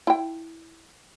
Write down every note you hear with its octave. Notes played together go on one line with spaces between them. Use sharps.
E4 G5